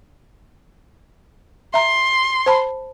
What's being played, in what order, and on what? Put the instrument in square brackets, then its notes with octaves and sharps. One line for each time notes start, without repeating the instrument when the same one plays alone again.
[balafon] E5 A#5 [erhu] C6
[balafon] C5 A5 B5